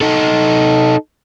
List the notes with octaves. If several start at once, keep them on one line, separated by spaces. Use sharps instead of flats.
D#4 A4